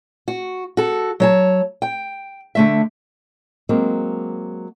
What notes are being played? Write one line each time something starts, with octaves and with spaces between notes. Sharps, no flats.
F#4
F#4 A4
F#3 C#5 A5
G5
D3 A3 E5
F#3 G#3 A#3 C4